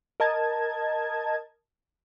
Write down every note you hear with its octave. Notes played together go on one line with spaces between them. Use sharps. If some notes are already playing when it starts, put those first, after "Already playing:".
A#4 D#5 A5 G#6